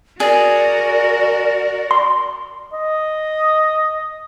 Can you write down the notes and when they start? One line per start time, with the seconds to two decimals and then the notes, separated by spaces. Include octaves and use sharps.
0.20 F#4 G#4 A#4 D5
1.91 C6
2.73 D#5